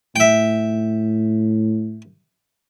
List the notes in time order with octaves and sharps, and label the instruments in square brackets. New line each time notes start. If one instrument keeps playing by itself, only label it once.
[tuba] A2 [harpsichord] E5 G5